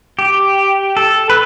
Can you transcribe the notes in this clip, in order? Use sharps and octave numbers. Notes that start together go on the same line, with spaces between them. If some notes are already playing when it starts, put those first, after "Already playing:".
G4
A4
B4